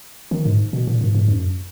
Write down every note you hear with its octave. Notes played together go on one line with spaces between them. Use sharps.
D#3
G#2
B2
A#2
G#2
G#2
F#2